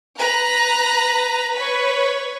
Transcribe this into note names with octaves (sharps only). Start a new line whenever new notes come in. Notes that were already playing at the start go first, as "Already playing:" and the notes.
B4 A#5 F#6
B4 C#5